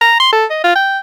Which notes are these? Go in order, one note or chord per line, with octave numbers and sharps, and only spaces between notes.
A#5
C6
A4
D#5
F4
G5